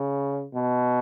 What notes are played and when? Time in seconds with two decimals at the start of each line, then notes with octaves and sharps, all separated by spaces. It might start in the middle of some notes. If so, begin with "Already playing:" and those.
Already playing: C#3
0.54 B2